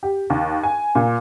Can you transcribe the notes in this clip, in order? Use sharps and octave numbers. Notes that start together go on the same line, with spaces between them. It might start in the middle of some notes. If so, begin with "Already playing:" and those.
G4
D#2
G#5
A#2